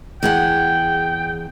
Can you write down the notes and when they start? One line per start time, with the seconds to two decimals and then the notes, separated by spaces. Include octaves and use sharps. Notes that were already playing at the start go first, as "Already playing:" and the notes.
0.23 E2 G#4 F#5 G5